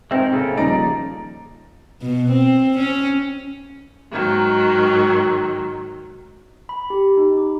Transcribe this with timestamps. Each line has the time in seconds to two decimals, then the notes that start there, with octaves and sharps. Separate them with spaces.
0.11 G#3 C4 D#4 A#4 E5
0.32 C#3 A#3 A4
0.57 D#1 F3 D#4 D5 A#5
2.02 B2
2.32 C4
2.78 C#4
4.13 G#2 D#3 F#3
6.69 B5
6.90 G4
7.17 D#4
7.38 D6